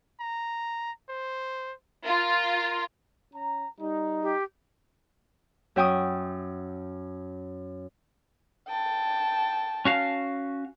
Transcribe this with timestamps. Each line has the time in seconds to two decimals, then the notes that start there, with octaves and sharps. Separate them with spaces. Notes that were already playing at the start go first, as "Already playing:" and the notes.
0.20 A#5
1.09 C5
2.05 F4 A#4
3.34 C#4 A#5
3.80 G3 D#4
4.22 G4
5.76 F#2 E5 G5 C#6 D#6
8.68 G5 A5
9.85 C#4 F#4 F5